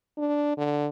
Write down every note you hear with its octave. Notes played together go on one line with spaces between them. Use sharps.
D4
D3